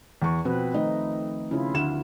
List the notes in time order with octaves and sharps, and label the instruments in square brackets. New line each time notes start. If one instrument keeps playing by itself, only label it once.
[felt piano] E2 C#6
[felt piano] B2 [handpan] F3 C4 B4
[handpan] D#3 A3 D#4 [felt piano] D#5
[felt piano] C#3 [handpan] E4 F4
[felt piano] D2 E7